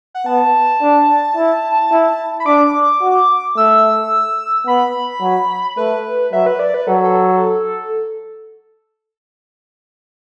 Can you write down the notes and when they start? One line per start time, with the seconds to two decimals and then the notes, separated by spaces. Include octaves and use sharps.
0.15 F#5
0.26 B3 A5
0.81 D4
1.36 E4
1.91 E4
2.40 B5
2.46 D4 D6
3.02 F#4
3.57 A3 E6
4.67 B3 B5
5.22 F#3
5.77 A3 B4
6.33 F#3 E5
6.46 B4
6.59 D5
6.74 B4
6.87 F#3 A4
7.04 A4